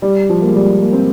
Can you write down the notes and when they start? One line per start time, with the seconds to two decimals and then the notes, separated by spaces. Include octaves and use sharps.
0.02 G3
0.29 F3
0.42 A#3
0.48 G#3
0.56 G3
0.82 A#3
0.93 C4